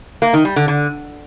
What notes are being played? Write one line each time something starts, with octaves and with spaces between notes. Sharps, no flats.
A#3
D#3
G3
D3
D3